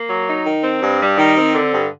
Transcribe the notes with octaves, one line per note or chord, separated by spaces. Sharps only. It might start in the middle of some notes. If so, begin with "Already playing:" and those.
Already playing: A#3
F#3
D#4
D#3
C4
G2
G3
D#3
C4
D3
G2